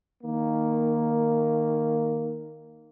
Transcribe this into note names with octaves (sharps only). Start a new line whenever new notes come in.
D#3 A#3